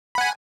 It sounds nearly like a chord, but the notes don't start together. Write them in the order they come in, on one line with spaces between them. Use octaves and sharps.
B5 F#5 G#5